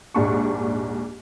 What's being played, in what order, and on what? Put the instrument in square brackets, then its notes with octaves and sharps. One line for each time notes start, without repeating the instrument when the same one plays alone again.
[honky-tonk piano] A#1 D#2 G#2 D4 C#6